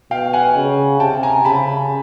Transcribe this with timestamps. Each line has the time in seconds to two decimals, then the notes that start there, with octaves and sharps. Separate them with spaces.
0.11 B2 F5 G5
0.33 F#5 G#5
0.55 C#3
1.00 C3 G5 A5
1.23 G#5 A#5
1.45 C#3 A5 B5